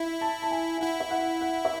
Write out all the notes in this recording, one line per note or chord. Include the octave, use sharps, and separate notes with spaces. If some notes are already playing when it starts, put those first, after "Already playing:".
Already playing: E4
A5
A5
G#5
E4 F#5
E5
F#5
F#5
E5